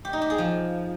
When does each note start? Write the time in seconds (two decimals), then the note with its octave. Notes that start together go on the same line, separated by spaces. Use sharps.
0.05 G4
0.13 D#4
0.21 G4
0.30 G#4
0.38 F3